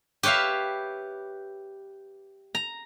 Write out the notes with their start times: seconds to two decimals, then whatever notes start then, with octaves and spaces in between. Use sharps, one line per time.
0.23 G4 B4 C#5 E5 F5
2.55 A#5